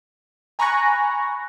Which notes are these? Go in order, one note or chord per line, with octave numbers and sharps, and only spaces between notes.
G#5 A#5 B5 C#6 F#6 A#6